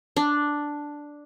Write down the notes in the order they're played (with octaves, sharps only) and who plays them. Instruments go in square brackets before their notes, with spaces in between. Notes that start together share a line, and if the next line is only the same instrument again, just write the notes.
[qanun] D4